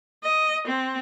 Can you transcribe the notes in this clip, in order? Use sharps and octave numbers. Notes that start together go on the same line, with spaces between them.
D#5
C4